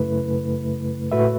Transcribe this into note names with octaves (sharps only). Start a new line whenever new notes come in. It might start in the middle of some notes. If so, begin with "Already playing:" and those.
Already playing: F#2 C#3 A3 E4 B4
A2 A3 F#4 B4 E5